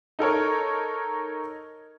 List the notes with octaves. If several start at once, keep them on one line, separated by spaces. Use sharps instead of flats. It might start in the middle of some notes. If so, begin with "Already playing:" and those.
D#4 A4 A#4 C#5